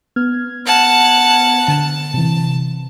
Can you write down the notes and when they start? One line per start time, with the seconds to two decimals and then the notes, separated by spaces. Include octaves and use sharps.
0.16 B3 F6 G#6
0.66 F#5 A5
1.68 D3 A5
2.14 C3 E3